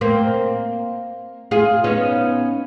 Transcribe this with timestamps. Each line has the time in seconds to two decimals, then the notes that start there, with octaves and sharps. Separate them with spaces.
0.01 A#3 C4
1.51 F4 G#4
1.84 B3 C#4 D#4